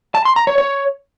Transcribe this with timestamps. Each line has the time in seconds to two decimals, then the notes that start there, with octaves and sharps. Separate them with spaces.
0.15 A5
0.25 C6
0.36 A#5
0.47 C#5
0.58 C#5